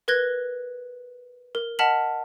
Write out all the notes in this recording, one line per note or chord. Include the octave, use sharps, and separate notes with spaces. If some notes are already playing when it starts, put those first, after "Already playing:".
A#4 B4 F#6 G#6 A#6 G7
A#4
D#5 F#5 A5 F6 B6 F#7